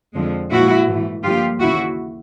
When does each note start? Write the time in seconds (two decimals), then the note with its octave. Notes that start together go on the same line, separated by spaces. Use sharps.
0.14 F2 D3 F3 G#3
0.51 A#2 F3 G#3 E4 F#4
0.86 G#2 E3 A3
1.23 G2 D3 F3 A#3 F4 G4
1.60 D#2 C#3 E3 E4 F#4